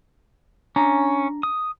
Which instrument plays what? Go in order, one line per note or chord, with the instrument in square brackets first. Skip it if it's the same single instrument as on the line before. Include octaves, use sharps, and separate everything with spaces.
[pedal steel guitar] C#4 [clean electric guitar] D4 A#5
[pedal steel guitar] D#6